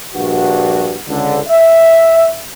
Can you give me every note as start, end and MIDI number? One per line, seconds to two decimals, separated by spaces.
0.15 0.97 34
0.15 0.97 43
0.15 0.97 66
1.08 1.39 37
1.08 1.39 50
1.48 2.38 76